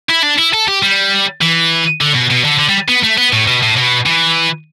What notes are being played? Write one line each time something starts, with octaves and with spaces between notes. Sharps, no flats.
E4
D4
E4
A4
G4
G3
E3
D3
B2
B2
D3
D3
G3
B3
A3
B3
A2
B2
A2
B2
E3